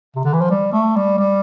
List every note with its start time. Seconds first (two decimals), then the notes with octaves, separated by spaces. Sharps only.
0.16 C3
0.25 D3
0.33 E3
0.41 F3
0.50 G3
0.73 A3
0.96 G3
1.19 G3